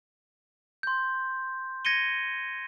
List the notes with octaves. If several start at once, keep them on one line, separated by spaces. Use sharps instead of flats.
C6 G6
G#6 A#6 C#7 D#7 G7